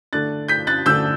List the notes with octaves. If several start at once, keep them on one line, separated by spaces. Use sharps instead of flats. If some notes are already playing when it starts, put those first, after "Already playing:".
D3 A3 D4 F#6 A6
G6 B6
F#6 A6
D3 A3 D4 E6 G6